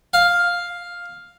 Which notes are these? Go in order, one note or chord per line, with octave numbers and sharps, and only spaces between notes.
F5